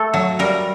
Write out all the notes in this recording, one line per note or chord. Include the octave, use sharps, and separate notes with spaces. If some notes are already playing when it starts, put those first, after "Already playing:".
Already playing: A3 A4
F#3
G3 A#4